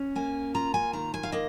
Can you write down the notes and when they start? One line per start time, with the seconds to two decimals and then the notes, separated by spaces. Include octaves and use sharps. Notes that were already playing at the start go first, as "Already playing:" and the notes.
Already playing: C#4
0.16 A#3 G#5
0.54 F4 A#5
0.74 G#5
0.93 D#3 A#5
1.14 G#5
1.23 F5
1.32 A#3 D#5